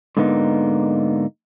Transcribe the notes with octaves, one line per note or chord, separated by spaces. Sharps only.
G#2 D3 A#3 B3 D#4